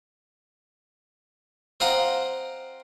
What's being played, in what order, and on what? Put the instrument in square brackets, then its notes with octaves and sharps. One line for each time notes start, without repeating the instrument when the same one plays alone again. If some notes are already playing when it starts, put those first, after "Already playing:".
[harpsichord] C4 F4 D#5 F#5 A#5